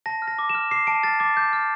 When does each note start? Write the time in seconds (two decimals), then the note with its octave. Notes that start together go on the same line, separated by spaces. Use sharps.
0.06 A5 A#6
0.22 F6
0.28 A#6
0.39 D6
0.49 E7
0.55 F6
0.71 D6 C7
0.87 A5 D7
1.03 F6 A6
1.20 D6 A6
1.37 D6 G6
1.53 F6